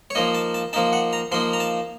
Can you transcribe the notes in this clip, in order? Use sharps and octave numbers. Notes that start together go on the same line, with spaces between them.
C#5
F3 A#3 D#4 D#5
A5
A5
F3 A#3 D#4 A5
F#5
A#5
F3 A#3 D#4 C6
A#5
A5